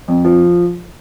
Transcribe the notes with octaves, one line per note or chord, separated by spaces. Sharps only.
F2
F3